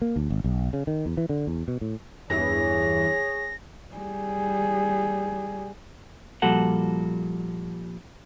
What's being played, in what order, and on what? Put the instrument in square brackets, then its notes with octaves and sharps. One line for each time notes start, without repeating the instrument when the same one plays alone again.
[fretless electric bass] A#3
D2
G#1
B1
C#3
D#3
E2
E3
D3
E2
B2
A2
[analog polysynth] E2 G2 E3 [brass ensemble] G#4 C#5 [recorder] A#6
[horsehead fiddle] G3 G#4
[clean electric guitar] A#2 F3 G3 F#4 A4 F#5